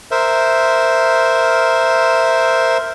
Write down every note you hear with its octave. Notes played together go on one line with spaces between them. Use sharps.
A#4 C5 E5